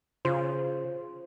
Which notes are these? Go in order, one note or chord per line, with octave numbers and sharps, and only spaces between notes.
C#3 F4 C5